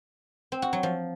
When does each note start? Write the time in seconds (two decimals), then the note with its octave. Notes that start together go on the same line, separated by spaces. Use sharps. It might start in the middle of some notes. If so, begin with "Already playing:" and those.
0.52 C4
0.62 F#4
0.73 F#3
0.83 F3